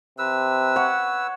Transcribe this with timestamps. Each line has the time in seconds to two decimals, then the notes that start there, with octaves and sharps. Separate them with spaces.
0.19 C3 B4 E6
0.76 C#5 F#5